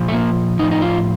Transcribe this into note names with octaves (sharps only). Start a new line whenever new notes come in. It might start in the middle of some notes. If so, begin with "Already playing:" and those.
Already playing: A#2 F3
A3
A#3
A2 F3 D#4
D#4
F4